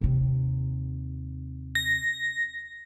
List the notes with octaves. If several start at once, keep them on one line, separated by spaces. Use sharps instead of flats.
D#2 C3
A#6